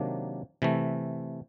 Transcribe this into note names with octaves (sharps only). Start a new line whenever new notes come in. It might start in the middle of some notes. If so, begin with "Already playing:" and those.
Already playing: C3 D#3 F#3 A#3 D4
C3 E3 A3